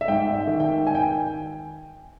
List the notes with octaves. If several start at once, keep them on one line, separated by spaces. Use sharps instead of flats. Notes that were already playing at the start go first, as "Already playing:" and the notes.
E5
G#2 G5
E5
D#3
G5
G#5
G5